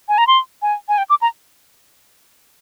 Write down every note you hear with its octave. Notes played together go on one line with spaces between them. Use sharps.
G#5
A#5
C6
G#5
G#5
G5
D6
A#5